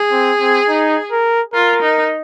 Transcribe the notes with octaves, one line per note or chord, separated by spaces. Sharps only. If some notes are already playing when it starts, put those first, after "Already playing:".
Already playing: G#4
C4
C4
D#4
A#4
F4 A#4
D#4